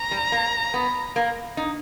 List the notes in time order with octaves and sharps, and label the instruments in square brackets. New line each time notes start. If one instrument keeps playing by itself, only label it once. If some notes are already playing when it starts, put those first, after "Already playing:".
Already playing: [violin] A#5
[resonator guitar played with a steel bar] G3
A#3
B3
A#3
D#4